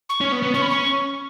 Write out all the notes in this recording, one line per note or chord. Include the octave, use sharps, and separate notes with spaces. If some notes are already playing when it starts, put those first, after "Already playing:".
C#6
C#4
B3
B3
C#4 C#6
B5
C#6